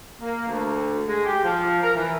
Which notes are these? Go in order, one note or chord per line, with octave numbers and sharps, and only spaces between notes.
A#3
D2
G#3
G4
F3
A#4
E3